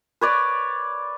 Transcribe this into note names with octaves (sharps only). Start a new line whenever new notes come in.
B4 C#5 D5